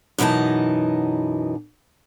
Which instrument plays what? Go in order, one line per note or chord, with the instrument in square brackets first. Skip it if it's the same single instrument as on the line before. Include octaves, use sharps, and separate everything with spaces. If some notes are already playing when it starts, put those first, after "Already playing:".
[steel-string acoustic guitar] F#2 B2 E3 D#4 A5